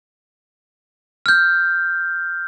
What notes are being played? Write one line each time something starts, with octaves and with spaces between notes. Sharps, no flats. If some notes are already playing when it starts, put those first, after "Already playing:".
F6 G6